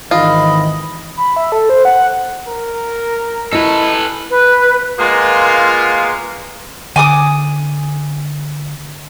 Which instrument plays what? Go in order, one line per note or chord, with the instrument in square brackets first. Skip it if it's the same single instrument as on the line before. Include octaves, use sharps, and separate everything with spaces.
[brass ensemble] G#1 D#3 E3 [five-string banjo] F4 [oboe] D#5 [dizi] B5
[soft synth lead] B5
E5
A4
C5
F#5
[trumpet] A#4
[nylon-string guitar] E4 D#5 [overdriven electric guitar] A4 B4
[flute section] B4
[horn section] G#3 A#3 B3 F4
[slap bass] D3 [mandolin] G#5 D6 D#6